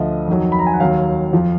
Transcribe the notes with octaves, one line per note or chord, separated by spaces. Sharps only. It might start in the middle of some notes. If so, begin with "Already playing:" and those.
Already playing: D2 D3 F3 D#5
F2 D#3 F#3
B5
A#5
G#5
F#5
D#2 D#3 F#3 F5
F2 F3